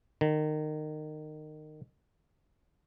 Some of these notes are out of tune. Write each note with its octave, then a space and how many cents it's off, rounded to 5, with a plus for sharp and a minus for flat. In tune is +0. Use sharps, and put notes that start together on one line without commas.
D#3 -25